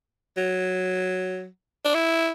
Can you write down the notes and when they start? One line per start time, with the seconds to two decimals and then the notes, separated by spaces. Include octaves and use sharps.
0.37 F#3
1.85 D4
1.94 E4